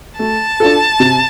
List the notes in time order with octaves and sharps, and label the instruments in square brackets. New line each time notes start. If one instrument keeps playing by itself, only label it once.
[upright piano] A3 [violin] A5
[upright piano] D4 F4 A4
C3